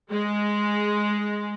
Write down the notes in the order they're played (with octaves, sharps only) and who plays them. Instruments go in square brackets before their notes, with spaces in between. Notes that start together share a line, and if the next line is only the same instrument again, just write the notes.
[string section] G#3